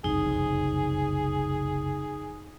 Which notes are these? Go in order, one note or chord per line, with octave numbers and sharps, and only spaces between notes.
F#1 C2 F2 D#4 G#4